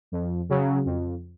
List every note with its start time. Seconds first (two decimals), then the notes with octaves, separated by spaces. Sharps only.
0.12 F2
0.49 C#3 F#3
0.85 F2